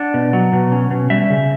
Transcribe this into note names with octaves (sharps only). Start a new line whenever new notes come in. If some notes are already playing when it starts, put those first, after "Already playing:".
Already playing: D4 F#5
B2
F#3
B2
C#4
B2
G3 E5
C#3